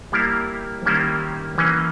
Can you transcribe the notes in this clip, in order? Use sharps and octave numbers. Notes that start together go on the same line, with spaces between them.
G3 A#3 E4 A#4
D#3 G3 A#3 C#4 E4
E3 A#3 C#4